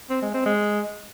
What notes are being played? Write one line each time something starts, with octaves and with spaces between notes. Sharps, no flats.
C4
G#3
C4
G#3